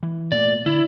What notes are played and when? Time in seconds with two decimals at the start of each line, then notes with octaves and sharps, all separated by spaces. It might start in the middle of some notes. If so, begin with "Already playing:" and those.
0.03 E3
0.32 A#2 A3 D5
0.66 D3 E4